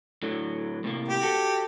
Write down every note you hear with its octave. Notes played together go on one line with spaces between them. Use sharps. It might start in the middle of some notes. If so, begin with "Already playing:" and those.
A2 D3 F#3
A2 C3 A#3
G4
F#4 A4